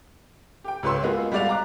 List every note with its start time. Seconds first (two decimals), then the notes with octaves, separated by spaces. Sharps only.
0.64 G4 G5
0.83 C#2 G4 B4 C#5 C6 E6
1.03 G#3 A#3 B3 F4 F#4
1.32 G3 G#3 F#4 D5 F5 F7
1.49 A#5 D6 F#6